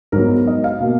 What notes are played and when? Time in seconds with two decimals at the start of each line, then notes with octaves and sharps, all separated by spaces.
0.12 G#2 F#3 B3 A#4
0.47 D#5
0.64 F5
0.80 B2 A#3